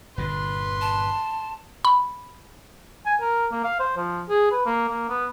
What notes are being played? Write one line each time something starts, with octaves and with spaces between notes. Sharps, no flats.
G1 A#2 D3 B4 C6
A5
B5
G#5
A#4
A#3
F5
C5
F3
G#4
B4
A#3
A#3
B3